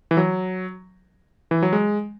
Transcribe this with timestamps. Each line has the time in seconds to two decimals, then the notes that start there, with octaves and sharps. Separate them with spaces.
0.11 E3
0.17 F#3
1.51 E3
1.62 F#3
1.73 G#3